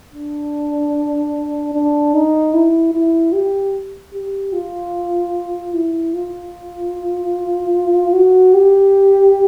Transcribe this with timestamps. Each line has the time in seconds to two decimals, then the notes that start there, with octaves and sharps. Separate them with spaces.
0.14 D4
1.73 D4
2.14 D#4
2.54 E4
2.94 E4
3.33 G4
4.13 G4
4.53 F4
5.74 E4
6.14 F4
8.13 F#4
8.54 G4